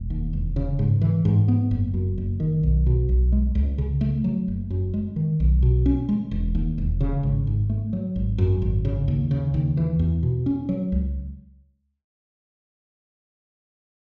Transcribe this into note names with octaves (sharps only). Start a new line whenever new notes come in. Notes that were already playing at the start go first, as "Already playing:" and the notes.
Already playing: E1
D#2
E1
C#3
G#2
E3
G#2
B3
F#1
F#2
F#1
D#3
B1
B2
B1
G#3
C#2
C#3
A3
F#3
F#1
F#2
G#3
D#3
B1
B2
C#4
G#3
E1
D#2
E1
C#3
G#1
G#2
A3
F#3
G#1
F#2
G#1
C#3
D#2
C#3
D#2
E3
E2
B2
C#4
F#3
C#2